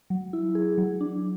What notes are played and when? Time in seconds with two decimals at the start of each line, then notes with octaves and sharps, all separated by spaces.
0.10 F#3
0.33 E4
0.55 G#4
0.78 F#3
1.01 D4